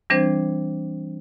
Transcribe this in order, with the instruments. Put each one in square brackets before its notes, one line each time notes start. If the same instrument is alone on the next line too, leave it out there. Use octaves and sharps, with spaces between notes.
[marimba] E3 G3 C4 D4 C5 G#6